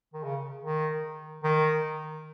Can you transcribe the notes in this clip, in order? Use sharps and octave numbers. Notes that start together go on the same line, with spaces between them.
D#3
C#3
D#3
D#3